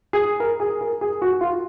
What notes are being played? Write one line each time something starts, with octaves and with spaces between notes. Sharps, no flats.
G#4
A#4
G#4
A#4
G#4
F#4
F4